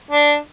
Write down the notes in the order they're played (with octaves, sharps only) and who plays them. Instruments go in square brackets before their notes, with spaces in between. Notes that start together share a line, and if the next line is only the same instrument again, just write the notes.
[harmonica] D4